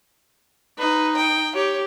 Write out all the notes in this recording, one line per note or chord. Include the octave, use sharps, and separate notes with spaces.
D#4 B4
G5
G4 C#5